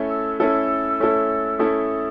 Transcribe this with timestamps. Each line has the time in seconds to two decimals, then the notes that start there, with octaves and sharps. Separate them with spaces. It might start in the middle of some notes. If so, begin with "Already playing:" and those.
Already playing: A3 C#4 E4 A4
0.10 E6
0.40 A3 C#4 E4 A4 E6
1.00 A3 C#4 E4 A4
1.59 A3 C#4 E4 A4 D#6